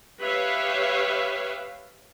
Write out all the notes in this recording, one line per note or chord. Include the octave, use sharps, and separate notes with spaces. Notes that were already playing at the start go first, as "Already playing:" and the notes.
G4 B4 C#5 E5 F5